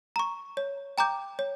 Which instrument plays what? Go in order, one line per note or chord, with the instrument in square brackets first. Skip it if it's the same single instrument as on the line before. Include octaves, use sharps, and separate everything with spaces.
[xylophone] A#5 C#6
C#5
G5 A#5 D6 G6
C#5